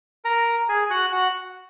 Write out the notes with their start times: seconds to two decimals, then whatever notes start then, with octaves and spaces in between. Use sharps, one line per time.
0.25 A#4 A#5
0.69 G#4 G#5
0.82 G#5
0.90 F#4 F#5
1.12 F#4 F#5